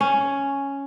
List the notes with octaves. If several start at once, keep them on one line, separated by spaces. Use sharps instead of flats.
C#4